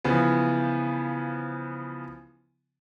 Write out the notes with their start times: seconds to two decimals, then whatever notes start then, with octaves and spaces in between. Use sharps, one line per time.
0.04 C#3 E3 F3 B3